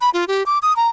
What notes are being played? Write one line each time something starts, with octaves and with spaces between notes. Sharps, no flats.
B5
F4
G4
D6
D#6
A#5